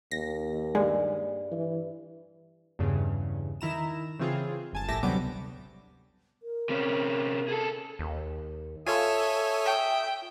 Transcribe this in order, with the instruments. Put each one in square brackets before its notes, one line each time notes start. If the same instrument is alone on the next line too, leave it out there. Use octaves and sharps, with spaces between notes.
[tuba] D#2 [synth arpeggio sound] A#6
[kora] G2 [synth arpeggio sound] G#3
[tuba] E3
[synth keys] E2 G2 C#3
D#3 E4 A#5 E7
C#3 E3 C4 F4 G#4
G1 G#5 A5
A#1 A2 G4 E5 A5 A#6
D2 C3 F#3 G3 B3 D6
[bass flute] A#4
[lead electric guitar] C3 C#4
G#4 A4
[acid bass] D#2
[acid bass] F4 [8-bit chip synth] A4 C#5 G#5 [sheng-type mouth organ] E5 D#6
[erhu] G5